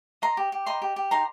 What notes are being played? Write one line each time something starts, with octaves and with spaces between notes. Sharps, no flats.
D#5 A#5 C6
G4
G4
D#5 A#5 C6
G4
G4
D#4 A#5 C6